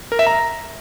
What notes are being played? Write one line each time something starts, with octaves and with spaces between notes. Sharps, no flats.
A#4
E5
A#5